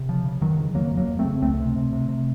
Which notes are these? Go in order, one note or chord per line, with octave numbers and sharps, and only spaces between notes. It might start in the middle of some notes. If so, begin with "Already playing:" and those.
Already playing: C3
C#3 F3
C#3
F2 D#3 F#3
C#3
F2 F#3 A#3
F2
F#3 A#3
F2
A3 C4
C#3
C#2 A3 C4
C3
C3
C3
C3